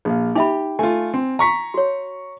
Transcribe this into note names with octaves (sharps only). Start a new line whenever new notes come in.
A#1 F5
D#4 G4 E5 B5
A3 F4 G#5
C4
A#5 C#6 B6
F#4 C#5